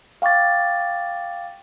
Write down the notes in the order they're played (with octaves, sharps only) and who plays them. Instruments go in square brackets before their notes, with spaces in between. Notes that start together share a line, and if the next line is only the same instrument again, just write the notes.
[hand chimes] F5 G5 C#6 D6 A6